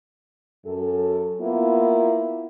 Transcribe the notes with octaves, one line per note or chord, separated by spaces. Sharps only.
F#2 A4
A#3 B3 E4 F4